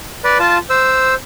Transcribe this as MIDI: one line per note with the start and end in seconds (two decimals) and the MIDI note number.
0.24 0.38 71
0.24 0.38 74
0.40 0.58 65
0.40 0.58 81
0.70 1.14 72
0.70 1.14 88